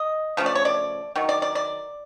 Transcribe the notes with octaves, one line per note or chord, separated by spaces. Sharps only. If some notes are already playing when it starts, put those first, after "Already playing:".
Already playing: D#5
C#3 F3 A3
D5
C#5
D5
D#3 F#3
D5
D5
D5